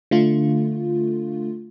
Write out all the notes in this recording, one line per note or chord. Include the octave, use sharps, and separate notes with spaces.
D3 A3 F4